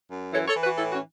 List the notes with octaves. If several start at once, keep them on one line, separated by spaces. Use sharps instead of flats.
F#2
E3 A4 C#5
A4 C#5
E3
F#4 B4
A2 E4 A4
C#4 F#4